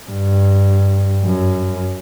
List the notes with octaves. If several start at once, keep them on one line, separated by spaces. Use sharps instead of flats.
G2
F#2